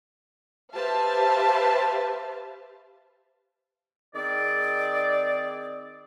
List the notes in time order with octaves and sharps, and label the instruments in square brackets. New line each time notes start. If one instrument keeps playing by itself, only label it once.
[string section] G4 B4 C5 E5 F5 A5
[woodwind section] D#3 C4 G#4 D5